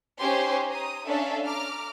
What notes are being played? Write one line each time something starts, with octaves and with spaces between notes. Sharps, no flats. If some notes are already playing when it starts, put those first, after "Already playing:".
C#4 D#4 G4 C5 G#5 C6
A#5 D#6
C#4 D4 A4 D5 E5 F5
A#5 D6 F6